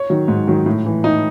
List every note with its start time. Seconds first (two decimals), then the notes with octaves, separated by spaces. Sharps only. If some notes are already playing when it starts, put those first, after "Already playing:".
Already playing: C#5
0.10 D#3 F#3
0.28 G#2
0.47 D#3 F#3
0.66 A2
0.86 E3
1.04 A2 D#4